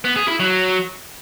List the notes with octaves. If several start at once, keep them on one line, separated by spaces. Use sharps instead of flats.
B3
G#4
E4
F#3